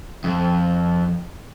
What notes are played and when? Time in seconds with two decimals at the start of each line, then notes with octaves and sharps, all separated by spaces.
0.24 F2